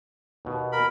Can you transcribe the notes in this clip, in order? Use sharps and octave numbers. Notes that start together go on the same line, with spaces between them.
D#2 B2
A#4 B5